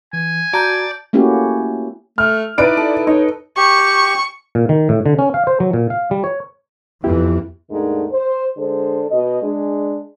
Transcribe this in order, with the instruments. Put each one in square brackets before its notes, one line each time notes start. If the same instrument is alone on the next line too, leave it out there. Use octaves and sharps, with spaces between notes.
[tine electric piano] E3 [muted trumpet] G#5
[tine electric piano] F#4 [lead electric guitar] D5 [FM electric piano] A5 A#5 G6
[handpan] A3 A#3 C#4 E4 F#4 G4
[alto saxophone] A3 [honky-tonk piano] F6
[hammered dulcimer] D#4 B4 [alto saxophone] E4 [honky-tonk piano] D5 D7
[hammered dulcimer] A4
[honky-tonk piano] D#4 [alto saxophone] C#5 [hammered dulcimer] D#5
[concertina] G4 [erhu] C#6
[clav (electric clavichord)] A#2
D#3
A2
D3
C#4
F5
C5
F#3
A#2
F5
G3
C#5
[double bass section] F2 E3 [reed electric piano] B3 E4 G4
[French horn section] D#2 G#2 D#3 A3 D4
C5
D3 G#3 D4 A4 C5
B2 D#5
G#3 D4